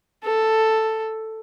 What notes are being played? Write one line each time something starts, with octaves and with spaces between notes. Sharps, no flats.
A4